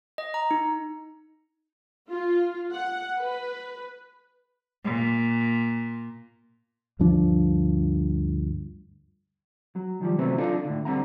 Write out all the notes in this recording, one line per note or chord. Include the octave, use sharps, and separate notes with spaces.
D#5
A#5
D#4
F4
F#5
B4
A#2
D2 G2 F3 D4
F#3
D#3 F3 G3
C3 E3 F#3 A3 B3 C4
D4 D#4 F4 A4
A2 D3
D2 D3 G3 C4 F#5 A#5